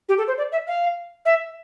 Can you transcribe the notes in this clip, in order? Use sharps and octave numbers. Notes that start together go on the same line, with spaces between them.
G4
A4
C5
D5
E5
F5
E5